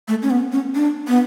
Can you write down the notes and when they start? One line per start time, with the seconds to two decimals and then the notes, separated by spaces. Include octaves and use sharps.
0.08 A3
0.22 C#4
0.31 B3
0.52 C#4
0.75 D4
1.07 B3